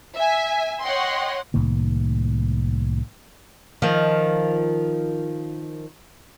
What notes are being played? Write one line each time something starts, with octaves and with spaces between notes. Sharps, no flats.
E5 G#5
C#5 D#5 F#5 G5 C6
C2 A2 D#3 A#3
D#3 F3